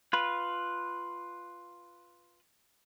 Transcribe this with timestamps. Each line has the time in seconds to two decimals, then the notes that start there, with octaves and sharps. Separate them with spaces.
0.13 F4 B4